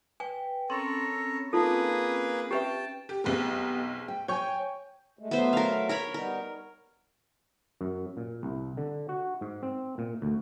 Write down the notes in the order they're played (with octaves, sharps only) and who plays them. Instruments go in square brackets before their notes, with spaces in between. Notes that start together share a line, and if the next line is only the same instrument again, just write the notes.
[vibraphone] B4 G5 [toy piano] G#5
[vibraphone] C4 C#4 B5 [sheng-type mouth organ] A4 A#4 C#5 [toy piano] C6
[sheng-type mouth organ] A#3 G#4 B4 [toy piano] D#4 F4 A4
[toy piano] G4 B4 E5 [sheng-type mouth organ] G5 A5
[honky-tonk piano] G4
[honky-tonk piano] B1 F2 G#3 [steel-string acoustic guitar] B3 G4
[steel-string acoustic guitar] G5
[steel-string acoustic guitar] C#5 G5 G#5 [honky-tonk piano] C#6 G6
[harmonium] G#3 A3
[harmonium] F#3 A3 E5 [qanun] B3 C5
[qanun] A#4 F5
A#4 C#5 B5
[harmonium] G3 B3 D#4 [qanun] A#4
[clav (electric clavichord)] F#2
A#2
C2
D3
F#4
G#2
C4
A#2
D2